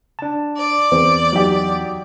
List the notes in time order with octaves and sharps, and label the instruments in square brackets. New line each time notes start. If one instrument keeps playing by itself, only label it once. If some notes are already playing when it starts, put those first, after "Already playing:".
[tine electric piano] D4 A5
[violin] D5
[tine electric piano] E2 [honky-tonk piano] C4
[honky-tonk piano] F#3 D#4 G4